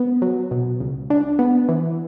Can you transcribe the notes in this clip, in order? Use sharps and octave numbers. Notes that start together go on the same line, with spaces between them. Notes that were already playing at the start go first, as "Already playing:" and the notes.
Already playing: B3
F#3
B2
C#2
D4
B3
E3